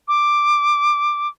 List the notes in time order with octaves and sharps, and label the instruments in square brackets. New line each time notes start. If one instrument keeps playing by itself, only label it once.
[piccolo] D6